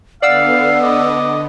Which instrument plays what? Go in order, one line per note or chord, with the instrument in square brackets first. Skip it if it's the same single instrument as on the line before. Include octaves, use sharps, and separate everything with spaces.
[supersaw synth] D3 B3 [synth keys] D5 F#5 E6 [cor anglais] F5 [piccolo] C7
[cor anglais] D#5 [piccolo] D6